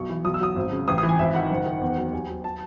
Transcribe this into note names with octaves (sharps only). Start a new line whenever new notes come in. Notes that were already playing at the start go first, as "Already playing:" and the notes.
Already playing: B1 C#6
E3
B1 D#6
E6
F#3 D#6
G#1
C#3
A1 D#6
D#6
E3
G#5
G#1 E5
D#3 F#5
F#1
D#3
E2
F#3
D#2 G#5
F#3
A5